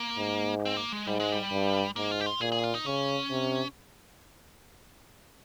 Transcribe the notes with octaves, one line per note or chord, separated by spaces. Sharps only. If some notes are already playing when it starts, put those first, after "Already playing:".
Already playing: A#3
G#2
C4
A#3
G#3
G#2 G3
G#3
G3
G2
G#2 A#3
F4
G4
F4
A#2 G#4
G#4
F4
D#4
C#3 C#4
C3